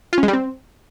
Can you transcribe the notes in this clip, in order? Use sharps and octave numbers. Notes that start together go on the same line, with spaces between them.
F4
C#4
G#3
G3
C4